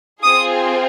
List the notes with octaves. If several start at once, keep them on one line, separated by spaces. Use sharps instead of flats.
C4 F4 G#4 D#6